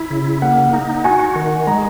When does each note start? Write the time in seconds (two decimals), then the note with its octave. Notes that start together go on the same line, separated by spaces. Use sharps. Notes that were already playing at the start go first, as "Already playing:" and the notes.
Already playing: E4
0.10 C#3
0.42 A#3 F#5
0.73 D#4
1.04 F#4 G#5
1.35 D#3
1.67 G#3 A#5